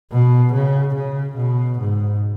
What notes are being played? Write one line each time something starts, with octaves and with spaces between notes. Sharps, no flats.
B2
C#3
C#3
B2
G#2